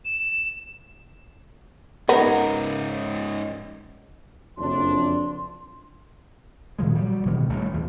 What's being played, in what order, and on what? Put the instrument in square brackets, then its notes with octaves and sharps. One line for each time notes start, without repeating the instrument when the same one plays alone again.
[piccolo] E7
[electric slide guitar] G#2 C#4 D#4 [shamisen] B3 [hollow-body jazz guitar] A#4
[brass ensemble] F#1 F2 D4 [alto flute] C6
[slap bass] A#2 D#3 F3 G#3
F#3 G3
B2 D3 D#3 B3
A1 D#2 G3 A3
E2 F3